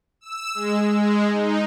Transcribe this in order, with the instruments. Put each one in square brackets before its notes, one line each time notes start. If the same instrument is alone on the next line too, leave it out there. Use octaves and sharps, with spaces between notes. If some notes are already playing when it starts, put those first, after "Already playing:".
[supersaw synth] E6
G#3
G#3
D#4